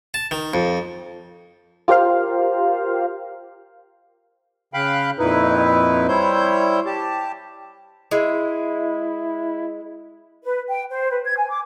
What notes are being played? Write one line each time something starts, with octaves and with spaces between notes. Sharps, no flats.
A5
D#3
F2
F4 G4 A#4 C5 F5
C#3 F5 G5 B5 F#6
F2 A#2 D#4 E4 B4
G3 E4 C5 C#5 G6
G4 A5
G#3 E4
B4
G5
C5
B4
G#6
G#5
D6